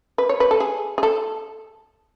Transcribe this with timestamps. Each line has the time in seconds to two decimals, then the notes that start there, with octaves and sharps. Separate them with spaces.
0.18 B4
0.29 C#5
0.40 B4
0.51 A4
0.60 G#4
0.98 G#4
1.03 A4